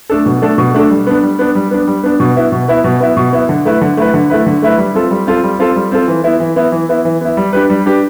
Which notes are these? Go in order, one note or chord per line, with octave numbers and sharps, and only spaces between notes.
A3 D4 A4
B2
A3 D4 A4
B2
A3 D4 A4
G3
B3 D4
G3
B3 D4
G3
B3 D4
G3
B3 D4
B2
B3 E4
B2
B3 E4
B2
B3 E4
B2
B3 E4
D3
A3 E4 B4
D3
A3 E4 B4
D3
A3 E4 B4
D3
A3 E4 B4
G3
C4 F4 A4
G3
C4 F4 A4
G3
C4 F4 A4
G3
C4 F4 A4
E3
B3 E4
E3
B3 E4
E3
B3 E4
E3
B3 E4
G3
D4 G4 B4
G3
D4 G4 B4